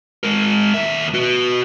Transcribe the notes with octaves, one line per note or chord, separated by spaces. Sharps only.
G#3 A#4
D#2 E5
F#4 B4